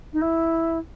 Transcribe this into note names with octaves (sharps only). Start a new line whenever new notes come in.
D#4
E4